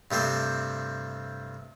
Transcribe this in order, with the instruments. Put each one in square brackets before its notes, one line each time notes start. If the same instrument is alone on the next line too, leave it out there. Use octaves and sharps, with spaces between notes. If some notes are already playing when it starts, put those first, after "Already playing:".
[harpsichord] G2 C3 A3 C4